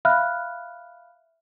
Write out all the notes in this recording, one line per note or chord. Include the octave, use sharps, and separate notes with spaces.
E5 F5 B5 F6 F#6